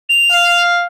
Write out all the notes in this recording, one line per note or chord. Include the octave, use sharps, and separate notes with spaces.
F7
F5